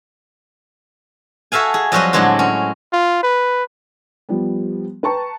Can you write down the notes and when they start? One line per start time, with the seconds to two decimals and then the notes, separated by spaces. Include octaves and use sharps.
1.52 F#4 A4 E5 F5 G#5
1.74 G#4
1.92 F2 F#3 G3 F#4 C5 D#5
2.13 A2 D3 F#3 G#3 C4 D4
2.39 C#4
2.93 F4
3.23 B4
4.29 F3 G3 B3
5.03 B4 G5 A5 A#5 C#6